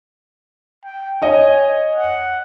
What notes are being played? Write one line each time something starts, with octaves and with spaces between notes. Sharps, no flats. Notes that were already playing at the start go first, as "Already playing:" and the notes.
G5
C#5 D#5 G#5
F#5